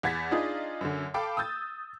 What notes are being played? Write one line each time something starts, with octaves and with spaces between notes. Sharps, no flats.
E2 F#5 G#6 A6 B6
D4 D#4 F4 G#4 D#5
F#2 D3
A4 F5 G5 A5 B5 D6
D#6 E6 G6 A6